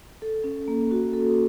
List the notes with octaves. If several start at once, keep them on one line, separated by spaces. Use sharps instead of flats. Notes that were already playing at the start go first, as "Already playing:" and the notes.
A4
C#4
A#3
F#4
A4